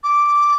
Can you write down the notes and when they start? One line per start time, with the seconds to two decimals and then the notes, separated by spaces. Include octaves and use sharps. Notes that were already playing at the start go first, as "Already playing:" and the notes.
0.03 D6